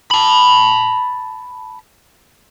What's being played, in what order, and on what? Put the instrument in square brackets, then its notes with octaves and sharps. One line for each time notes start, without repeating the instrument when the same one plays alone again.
[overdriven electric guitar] A5 B5